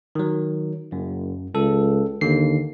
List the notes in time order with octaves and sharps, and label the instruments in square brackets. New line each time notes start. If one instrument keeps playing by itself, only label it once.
[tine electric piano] D#3 F#3
[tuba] F#1 [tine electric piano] F#2
[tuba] C#2 [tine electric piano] A4
[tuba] D#2 [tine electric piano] D3 C7